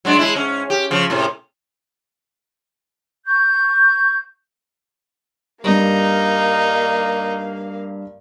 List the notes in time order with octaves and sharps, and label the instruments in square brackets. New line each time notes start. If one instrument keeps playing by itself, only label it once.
[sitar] F#3 G#3 D4
G#3 E4
G#2 C#4
G4
C#3 F3
A2 C3
[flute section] C#6 G6
[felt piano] G2 G3 [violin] A#3 F5 [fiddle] D#4